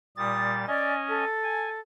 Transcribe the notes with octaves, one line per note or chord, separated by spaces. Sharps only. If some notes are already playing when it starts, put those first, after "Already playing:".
A#2 G3 D#6 A6
C#4 D5 D#5 G#5
A4
G#5